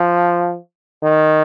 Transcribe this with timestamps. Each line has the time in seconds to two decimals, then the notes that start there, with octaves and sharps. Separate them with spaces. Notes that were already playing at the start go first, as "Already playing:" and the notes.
Already playing: F3
1.03 D#3